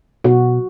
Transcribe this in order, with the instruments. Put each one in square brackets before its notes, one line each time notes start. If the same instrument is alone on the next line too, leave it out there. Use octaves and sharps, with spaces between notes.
[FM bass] B2 [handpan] F#4